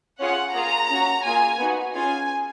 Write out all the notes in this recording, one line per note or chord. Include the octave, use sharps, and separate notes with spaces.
C#4 F4 G#4 F#5
A#3 F4 G#4 A#5
C#4 F#4
A#3 F4 G#4 G#5
B3 D#4 F#4
C#4 F4 G#4 G#5